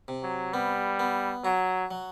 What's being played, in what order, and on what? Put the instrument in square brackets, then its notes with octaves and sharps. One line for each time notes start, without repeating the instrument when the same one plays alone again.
[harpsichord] C3
[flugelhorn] F#3
[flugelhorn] G3 [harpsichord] B3
[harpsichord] B3
[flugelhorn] F#3 [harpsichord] F#4
[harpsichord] F#3